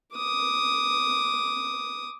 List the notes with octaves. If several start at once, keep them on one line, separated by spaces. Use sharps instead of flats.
D6 D#6